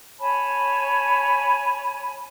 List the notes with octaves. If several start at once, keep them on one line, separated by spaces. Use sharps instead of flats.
C#5 G#5 A5 B5